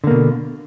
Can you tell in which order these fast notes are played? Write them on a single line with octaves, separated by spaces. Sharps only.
D3 A#3 B2